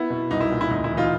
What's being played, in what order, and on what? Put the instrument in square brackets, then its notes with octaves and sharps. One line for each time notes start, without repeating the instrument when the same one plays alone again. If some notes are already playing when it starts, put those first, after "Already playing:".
Already playing: [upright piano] B3 E4
B2
C2 D#4
E4
A#2
E4
D2 D#4
E4
E3
D#4 F4